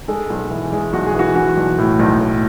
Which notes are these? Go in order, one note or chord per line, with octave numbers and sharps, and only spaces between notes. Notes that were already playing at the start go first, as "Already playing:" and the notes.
G#3 A4
B1
E3
G#3
B1 F#4
G#4
E3 F#4
E3 F#4
B1
A2
B1
A2